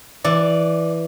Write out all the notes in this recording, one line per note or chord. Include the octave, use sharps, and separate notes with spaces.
E3 D5